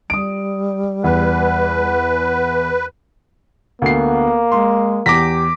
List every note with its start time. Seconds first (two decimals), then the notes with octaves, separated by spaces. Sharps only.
0.10 G3 D#6 D7
1.04 E2 B4
3.82 D2 A#3 B3 C7
4.52 G#3 C6
5.06 E2 G4 D6 A#6 B6